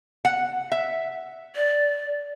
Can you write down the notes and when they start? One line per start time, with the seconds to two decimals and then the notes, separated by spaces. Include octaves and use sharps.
0.25 F#5
0.72 E5
1.56 D5